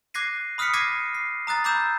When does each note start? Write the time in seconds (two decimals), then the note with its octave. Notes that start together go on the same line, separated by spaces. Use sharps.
0.14 D6 F#6 G#6 A#6 C7 D#7
0.58 B5 D#6 F6 F#6 B6 C#7
0.73 D6 F6 G#6 A#6 C7 D#7
1.15 C7
1.47 A#5 D#6 F#6 A6
1.64 A#5 B5 D6 E6 G6 E7